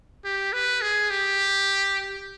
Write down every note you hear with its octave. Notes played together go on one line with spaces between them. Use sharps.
G4
B4
G#4
G4